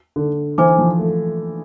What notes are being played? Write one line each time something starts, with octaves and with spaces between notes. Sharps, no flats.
D3
E3 C5 G#5 D6
F3
A3